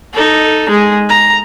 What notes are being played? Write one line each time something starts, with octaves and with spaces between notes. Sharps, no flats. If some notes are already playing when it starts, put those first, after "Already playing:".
D#4 A4
G#3 G#4
A#5